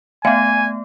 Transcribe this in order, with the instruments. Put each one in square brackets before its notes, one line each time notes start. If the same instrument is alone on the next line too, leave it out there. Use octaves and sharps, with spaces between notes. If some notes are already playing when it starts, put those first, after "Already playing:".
[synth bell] A3 B3 [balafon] E5 F5 G5 [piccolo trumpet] G#5